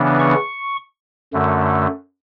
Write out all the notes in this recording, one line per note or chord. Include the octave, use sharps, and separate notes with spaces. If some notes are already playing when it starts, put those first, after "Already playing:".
Already playing: C#3 E3 B3 D4
C#6
F#2 D3 A3